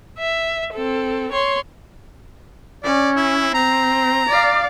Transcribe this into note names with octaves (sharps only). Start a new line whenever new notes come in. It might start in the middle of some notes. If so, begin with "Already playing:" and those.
E5
C4 A4
C#5 C6
C#4 D5
E4
C4 A#5
D5 F5